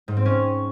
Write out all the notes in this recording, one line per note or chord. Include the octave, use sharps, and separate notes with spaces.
G#2
C4
C#4